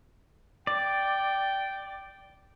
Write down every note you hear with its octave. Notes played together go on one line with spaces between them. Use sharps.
D5 G5